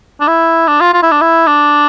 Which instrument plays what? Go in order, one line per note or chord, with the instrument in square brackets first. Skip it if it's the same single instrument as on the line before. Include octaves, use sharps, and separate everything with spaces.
[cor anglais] D4
E4
D4
F4
F4
E4
D4
E4
D4